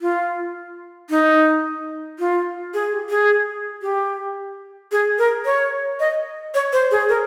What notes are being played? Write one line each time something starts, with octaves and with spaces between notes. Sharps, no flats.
F4
D#4
F4
G#4
G4
G#4
G4
G#4
A#4
C#5
D#5
C#5
C5
G#4
A#4